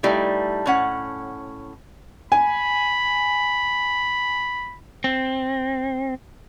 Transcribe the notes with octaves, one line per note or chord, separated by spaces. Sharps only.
G3 A3 D#4 E4
A2 C#4 F#5
G#5 B5
C4